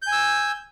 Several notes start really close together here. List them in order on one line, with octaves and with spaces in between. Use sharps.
G6 G#5 E6